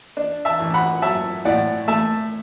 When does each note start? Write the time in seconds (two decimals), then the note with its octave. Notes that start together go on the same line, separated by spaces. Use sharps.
0.17 D4
0.45 E5 A5
0.60 A1
0.74 F#5 B5
1.02 F#3 E5 A5
1.45 A2 D5 F#5
1.88 A3 E5 A5